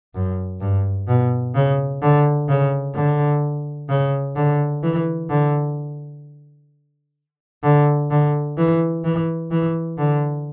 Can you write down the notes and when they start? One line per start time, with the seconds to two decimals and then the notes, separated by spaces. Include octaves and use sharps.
0.15 F#2
0.61 G2
1.08 B2
1.55 C#3
2.02 D3
2.49 C#3
2.95 D3
3.89 C#3
4.36 D3
4.83 E3
5.29 D3
7.63 D3
8.10 D3
8.57 E3
9.04 E3
9.51 E3
9.97 D3